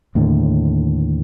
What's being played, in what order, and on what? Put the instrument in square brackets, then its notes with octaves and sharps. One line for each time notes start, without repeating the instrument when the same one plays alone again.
[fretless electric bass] D#2 A2 D3